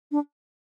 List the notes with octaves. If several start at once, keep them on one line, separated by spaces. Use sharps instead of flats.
D4